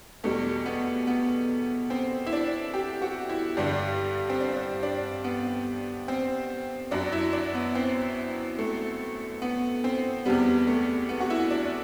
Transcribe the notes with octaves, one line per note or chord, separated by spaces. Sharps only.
E2 B2 G3 A3
B3
B3
C4
E4
D4
G4
F#4
E4
G2 D3 G3 D4
C4
D4
D4
B3
C4
F#2 F#3 D4
E4
D4
B3
C4
A3
B3
C4
E2 C3 G3 B3
A3
B3
F#4
E4
D4